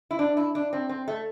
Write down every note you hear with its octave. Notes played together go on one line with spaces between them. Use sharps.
E4
D4
E4
D4
C4
C4
A3